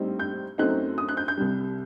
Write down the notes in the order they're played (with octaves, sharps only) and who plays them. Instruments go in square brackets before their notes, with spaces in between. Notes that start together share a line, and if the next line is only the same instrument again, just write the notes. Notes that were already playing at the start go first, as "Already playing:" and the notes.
Already playing: [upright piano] A#1 A2 G3 C4 D#4
G6
F#2 F#3 A3 C4 D#4 F#6
D#6
F#6
G6
G6
C2 C3 G3